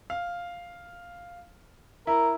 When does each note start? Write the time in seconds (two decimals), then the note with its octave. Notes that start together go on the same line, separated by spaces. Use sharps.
0.10 F5
2.07 E4 A#4